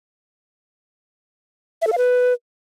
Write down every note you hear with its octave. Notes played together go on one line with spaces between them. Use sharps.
E5
A4
F5
B4